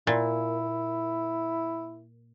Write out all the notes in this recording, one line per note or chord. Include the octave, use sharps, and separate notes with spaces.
A#2 E4